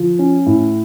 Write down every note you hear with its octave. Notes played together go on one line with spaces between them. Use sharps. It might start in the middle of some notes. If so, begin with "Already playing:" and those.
Already playing: F3
C#4
A2